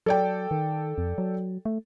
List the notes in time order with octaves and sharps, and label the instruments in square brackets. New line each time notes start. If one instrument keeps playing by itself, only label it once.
[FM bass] F#3 [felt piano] A4 D5 G5
[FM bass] D#3
F2
F#3
A3